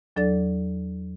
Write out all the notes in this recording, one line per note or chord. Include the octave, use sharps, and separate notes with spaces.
E2 F#3 D4 A4 D5 A6